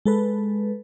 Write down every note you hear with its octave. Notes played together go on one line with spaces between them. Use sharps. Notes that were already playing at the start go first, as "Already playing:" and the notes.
G#3 A4 B4